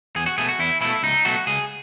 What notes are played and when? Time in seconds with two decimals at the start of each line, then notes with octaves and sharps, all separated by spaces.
0.16 E2 G#4
0.26 F#4
0.38 B2 A3 G#4
0.49 F#4
0.59 E2 E4
0.81 B2 A3 E4
1.03 C#2 D#4
1.25 B2 F#3 A3 F#4
1.47 C#2 G#4